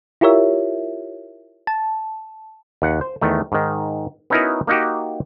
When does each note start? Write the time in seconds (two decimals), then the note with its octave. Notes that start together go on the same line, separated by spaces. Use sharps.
0.21 E4 F4 G4 A#4 C#5 E5
1.67 A5
2.82 D#2 F#5
3.01 C5
3.22 E2 D#3 A3
3.52 G#2 D#3
4.30 B3 C#4 D#4 E4 F#4 A#4
4.67 A#3 D#4 F#4 G4